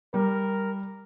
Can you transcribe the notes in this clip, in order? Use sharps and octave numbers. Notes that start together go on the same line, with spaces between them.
G3 A#4